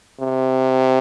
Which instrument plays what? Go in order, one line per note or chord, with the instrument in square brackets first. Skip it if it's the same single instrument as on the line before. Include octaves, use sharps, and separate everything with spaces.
[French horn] C3